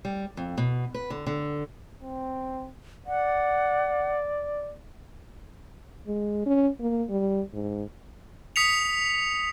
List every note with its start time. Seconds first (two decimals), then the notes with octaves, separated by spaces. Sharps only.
0.05 G3
0.37 F2
0.58 B2
0.94 B4
1.10 D3
1.27 D3
2.02 C4
3.06 D5 F#5
6.08 G#3
6.46 C#4
6.80 A#3
7.10 G3
7.54 G#2
8.56 D#6 B6 C#7 F7